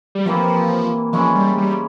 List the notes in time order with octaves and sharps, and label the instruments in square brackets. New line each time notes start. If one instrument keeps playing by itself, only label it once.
[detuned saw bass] G3
[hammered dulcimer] C3 E3 A#3 E4 [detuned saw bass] F3
[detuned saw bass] F3 [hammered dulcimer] G#3 C#4 E4
[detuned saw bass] G3
G3